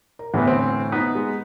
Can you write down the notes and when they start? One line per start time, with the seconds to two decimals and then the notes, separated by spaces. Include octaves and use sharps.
0.19 A#4
0.34 E2 A2 D3 E3 B3
0.48 C4
0.92 B3 D#4 B4
1.15 G#3